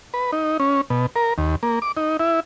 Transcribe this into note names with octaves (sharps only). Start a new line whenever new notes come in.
B4
D#4
C#4
B2
A#4
D#2
A#3
D6
D#4
E4